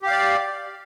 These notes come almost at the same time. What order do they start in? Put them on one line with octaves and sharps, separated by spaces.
G4 F5 D5